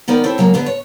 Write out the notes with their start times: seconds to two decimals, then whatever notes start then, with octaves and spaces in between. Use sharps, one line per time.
0.08 D#3 B3 A#4 D5 G5
0.24 C4 E4 A4 C#5
0.38 C#3 F#3 G#3 A#3
0.54 D3 B3 D4
0.66 C#5